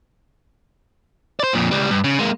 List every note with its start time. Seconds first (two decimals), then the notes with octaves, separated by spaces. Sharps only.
1.40 C5 D5
1.53 F2 A#2
1.71 C#2 G3
1.91 G2
2.04 C#3
2.19 G#3 A#3